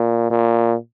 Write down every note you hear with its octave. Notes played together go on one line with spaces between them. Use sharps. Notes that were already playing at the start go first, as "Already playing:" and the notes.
Already playing: A#2
A#2